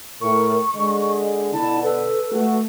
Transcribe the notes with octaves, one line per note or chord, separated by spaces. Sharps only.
A2 A#4 C#6
D3 G#3 D#5
B2 D3 E4 A5
A4 B4
A3 F#4